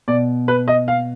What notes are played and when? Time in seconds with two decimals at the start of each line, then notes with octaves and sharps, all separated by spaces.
0.08 B2 D5
0.48 B4
0.68 D#5
0.88 F5